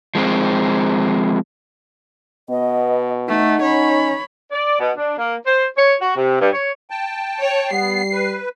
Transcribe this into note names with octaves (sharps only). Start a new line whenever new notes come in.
F3 G#3 B3 C4
B2 B3 D#5
A3 D#4 F#5
C#4 C#5 B5
D5
B2
D4
A#3
C5
C#5
F#4
C3
G2
C#5
G5 A5
C#5
G3 B3 C7
B4